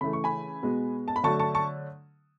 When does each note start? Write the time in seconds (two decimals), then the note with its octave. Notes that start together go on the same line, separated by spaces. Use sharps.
0.01 C#3 E3 A3 B5
0.13 C#6
0.24 G#5 B5
0.62 B2 G#3 B3
1.08 A5
1.16 B5
1.24 D3 F#3 A3 A5 C#6
1.39 A5 C#6
1.55 A5 C#6